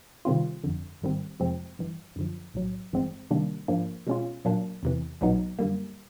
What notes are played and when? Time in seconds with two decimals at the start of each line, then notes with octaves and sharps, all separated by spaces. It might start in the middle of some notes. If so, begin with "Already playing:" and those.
0.25 C3 D#3 G3 C4 F4
0.64 G1 F2 D3
1.01 G#1 G#2 D#3 G3 C4
1.40 F2 C3 F3 G#3 C4
1.78 G1 G2 E3
2.16 F#2 D3 F3
2.54 B1 A2 F#3
2.92 G1 G2 E3 G#3 C4
3.30 C3 D#3 G3 A#3 D4
3.68 G#2 F3 A#3 D4
4.07 B2 G#3 C#4 F4
4.45 A#2 F#3 A#3 D4
4.83 E2 C3 E3
5.21 B1 A#2 F#3 B3 D#4
5.59 F#2 D3 G3 A#3